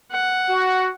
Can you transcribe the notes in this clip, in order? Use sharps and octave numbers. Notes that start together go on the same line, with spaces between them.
F#5
F#4